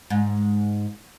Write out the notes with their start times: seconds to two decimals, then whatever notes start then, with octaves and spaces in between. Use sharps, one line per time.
0.10 G#2